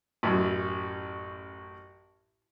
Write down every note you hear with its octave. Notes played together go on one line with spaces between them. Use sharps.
A1 F#2